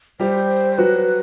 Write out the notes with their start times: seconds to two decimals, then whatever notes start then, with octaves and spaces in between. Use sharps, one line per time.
0.19 G3 G4 C5
0.78 F#3 F#4 B4